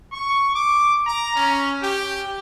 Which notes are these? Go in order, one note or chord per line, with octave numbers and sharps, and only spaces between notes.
C#6
D6
A#5
C#4
G4